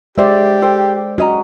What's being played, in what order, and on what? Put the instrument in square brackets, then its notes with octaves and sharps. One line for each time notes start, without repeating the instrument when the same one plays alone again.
[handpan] G#3 D5 [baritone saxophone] G4 [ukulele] C5 E5
[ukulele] A4 C5 G5
[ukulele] C#4 D#5 A#5 [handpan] F#4